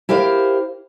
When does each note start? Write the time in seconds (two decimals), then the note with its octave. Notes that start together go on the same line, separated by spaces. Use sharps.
0.09 E4 G4 A#4 C5 F5